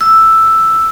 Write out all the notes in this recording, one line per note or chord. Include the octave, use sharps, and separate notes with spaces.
E6